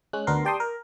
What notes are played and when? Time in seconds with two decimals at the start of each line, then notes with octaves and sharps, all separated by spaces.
0.13 G#3 C#4 F#6
0.27 D2 B3 D4 A#4 C6
0.45 G4 D5 G5 A5 C6 D#6
0.60 A#4